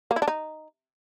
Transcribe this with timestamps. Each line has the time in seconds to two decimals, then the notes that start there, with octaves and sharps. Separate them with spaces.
0.11 A#3
0.16 E4
0.22 D4
0.28 D#4